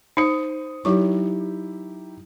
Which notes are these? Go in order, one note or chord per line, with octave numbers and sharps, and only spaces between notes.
D#4 C5 D#6 C#7
F#3 D#4 E4 G4 C#6